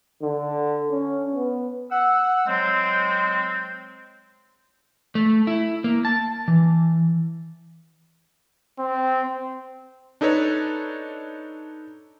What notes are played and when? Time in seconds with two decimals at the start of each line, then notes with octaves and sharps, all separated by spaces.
0.22 D3
0.91 C#4
1.34 B3
1.90 F#5 E6
2.47 F#3 G#3 C4
5.15 A3
5.47 E4
5.84 A#3
6.05 A5
6.48 E3
8.79 C4
10.21 D4 D#4 A4 B4 C#5